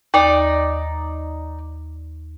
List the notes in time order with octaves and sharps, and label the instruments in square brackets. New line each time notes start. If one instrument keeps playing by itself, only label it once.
[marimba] D#2 [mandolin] D#4 D5